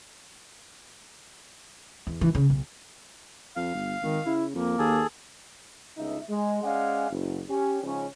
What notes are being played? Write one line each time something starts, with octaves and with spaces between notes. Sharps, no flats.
E2
E3
C#3
B1
F2 F5
G1
G#1 D#3
C#3 E4
F2 A#3
D#2 G#4 A4
G1 C#2 D#4 E5
G#3
G#3 C#4 D5 F5 F#5 G#5
F#1
C#4 G4
G#2 C#3 F3 C#4